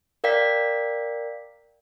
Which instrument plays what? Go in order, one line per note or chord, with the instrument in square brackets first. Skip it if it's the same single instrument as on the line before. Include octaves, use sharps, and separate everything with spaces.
[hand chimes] A#4 D5 F5 G5 B6